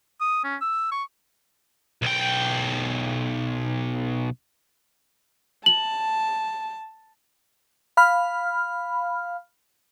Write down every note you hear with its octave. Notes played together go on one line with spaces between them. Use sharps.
D#6
C#4
E6
C#6
B1 G5
A5 F#7
F5 B5 F6